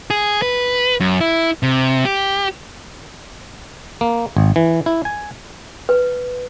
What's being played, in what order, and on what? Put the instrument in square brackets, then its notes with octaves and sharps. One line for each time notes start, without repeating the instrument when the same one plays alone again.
[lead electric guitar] G#4
B4
F#2
E4
C3
G4
[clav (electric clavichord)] A#3
G#1
E3
E4
G#5
[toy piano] B4